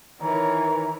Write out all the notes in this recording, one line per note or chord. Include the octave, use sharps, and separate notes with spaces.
D#3 E3 A#4 C#5 A#5